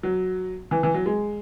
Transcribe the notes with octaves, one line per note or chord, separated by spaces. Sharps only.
F#3
E3
E3
F#3
G#3